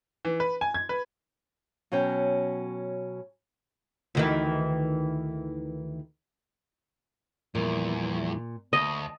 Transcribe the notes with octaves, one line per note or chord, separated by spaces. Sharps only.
E3
B4
G#5
G#6
B4
B2 F#3 C#4 G5
D2 D#3 E3
E2 A#2 F3 G3 E4
D2 D#5 A5